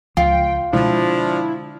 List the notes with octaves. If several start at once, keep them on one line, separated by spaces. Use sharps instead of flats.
C#2 F3 F4 G5
B2 D3 F3 G#3 D4 E4